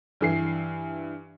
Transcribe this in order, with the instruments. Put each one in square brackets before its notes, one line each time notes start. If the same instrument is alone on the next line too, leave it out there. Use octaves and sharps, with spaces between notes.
[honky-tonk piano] G2 E3 C7